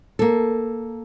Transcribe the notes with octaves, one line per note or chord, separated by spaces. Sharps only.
A#3 A4